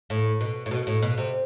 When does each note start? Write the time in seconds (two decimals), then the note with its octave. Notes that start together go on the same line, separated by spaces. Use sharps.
0.10 A2
0.41 B2
0.66 A2
0.71 B2
0.87 A2
1.03 B2
1.18 C3